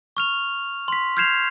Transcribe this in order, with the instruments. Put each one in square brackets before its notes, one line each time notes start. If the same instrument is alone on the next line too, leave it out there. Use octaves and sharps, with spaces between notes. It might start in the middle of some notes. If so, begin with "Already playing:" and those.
[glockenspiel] C#6 F6 F7
C6 B6
F6 G6 G#6 C7 E7 F7